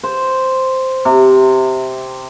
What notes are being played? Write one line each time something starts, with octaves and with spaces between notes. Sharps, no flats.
C5
C3